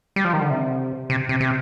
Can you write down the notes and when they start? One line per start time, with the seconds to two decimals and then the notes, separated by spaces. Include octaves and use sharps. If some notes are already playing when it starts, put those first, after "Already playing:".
0.16 G3
0.25 F3
0.33 D#3
0.41 D3
0.51 C3
1.10 C3
1.29 C3
1.40 C3